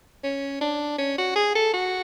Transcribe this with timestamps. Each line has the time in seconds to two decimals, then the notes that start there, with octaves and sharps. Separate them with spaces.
0.24 C#4
0.61 D4
0.98 C#4
1.18 F#4
1.36 G#4
1.55 A4
1.73 F#4